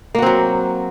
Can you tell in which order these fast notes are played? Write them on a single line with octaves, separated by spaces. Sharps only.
A#3 F#4 C4 F#3